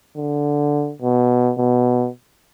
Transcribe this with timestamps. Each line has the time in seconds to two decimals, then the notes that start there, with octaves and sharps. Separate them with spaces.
0.17 D3
1.01 B2
1.58 B2